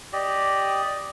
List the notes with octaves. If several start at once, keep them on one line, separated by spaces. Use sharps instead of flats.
G4 D5 D#5